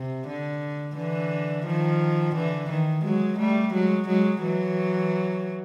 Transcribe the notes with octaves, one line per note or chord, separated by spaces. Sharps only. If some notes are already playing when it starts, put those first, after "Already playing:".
Already playing: C3
D3
D3 E3
D#3 F3
D3 E3
D#3
F#3 G#3
G3 A3
F#3 G#3
F#3 G#3
E3 F#3